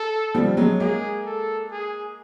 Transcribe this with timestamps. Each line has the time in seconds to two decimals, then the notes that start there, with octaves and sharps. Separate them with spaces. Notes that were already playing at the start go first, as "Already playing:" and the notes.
Already playing: A4
0.35 F3 G3
0.57 F#3 G#3
0.80 G#3 A#3 G#4
1.26 A4
1.71 G#4